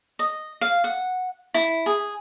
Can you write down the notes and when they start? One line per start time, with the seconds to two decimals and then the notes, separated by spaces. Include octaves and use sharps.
0.19 D#5
0.61 F5
0.84 F#5
1.54 E4
1.86 G#4